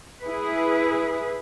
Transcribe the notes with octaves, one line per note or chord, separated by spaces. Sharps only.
E4 G#4 B4